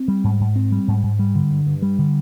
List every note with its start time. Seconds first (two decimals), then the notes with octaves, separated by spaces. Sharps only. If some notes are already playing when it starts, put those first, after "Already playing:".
Already playing: C4
0.08 G3
0.24 G#2
0.40 G#2
0.56 C4
0.72 G3
0.88 G#2
1.03 G#2
1.19 G3
1.35 D3
1.51 G2
1.66 G2
1.82 G3
1.98 D3